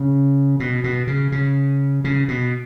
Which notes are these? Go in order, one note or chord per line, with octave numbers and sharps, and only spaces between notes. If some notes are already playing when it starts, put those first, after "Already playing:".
Already playing: C#3
B2
B2
C#3
C#3
C#3
B2